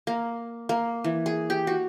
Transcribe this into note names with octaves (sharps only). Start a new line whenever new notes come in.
A#3
A#3
E3
G#4
G4
F#4